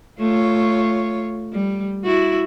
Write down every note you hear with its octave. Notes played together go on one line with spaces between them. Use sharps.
A3 F4 C#5
G3
E4 F#4